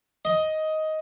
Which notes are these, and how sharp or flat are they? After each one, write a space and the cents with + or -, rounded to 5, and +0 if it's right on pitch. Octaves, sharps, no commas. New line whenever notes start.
D#5 +10